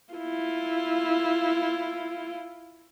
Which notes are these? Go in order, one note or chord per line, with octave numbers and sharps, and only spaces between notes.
E4 F4